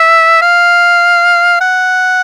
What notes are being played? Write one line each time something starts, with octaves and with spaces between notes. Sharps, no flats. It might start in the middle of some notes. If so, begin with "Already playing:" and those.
Already playing: E5
F5
F#5